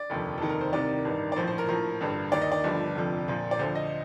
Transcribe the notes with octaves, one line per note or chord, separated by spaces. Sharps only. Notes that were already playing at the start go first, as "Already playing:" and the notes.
Already playing: D5
F1 D#2 D3 F3
F1 D#2 D#3 A4
A#4
C5
C2 C3 D#3 D5
A1 G2 D#3
D5
A#1 A2 F3 C5
C5
A#4
A#1 A2 F3 A#4
A1 G2 D3
D#2 D#3 D5
D#5
D5
G1 G2 D3 F3
F1 F2 D3 F3
A#1 A#2 F3
D5
D2 D3 F3 C5
D#5